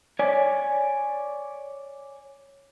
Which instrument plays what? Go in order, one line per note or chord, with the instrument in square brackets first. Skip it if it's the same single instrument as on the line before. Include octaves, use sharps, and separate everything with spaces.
[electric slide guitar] C#5 D5 G#5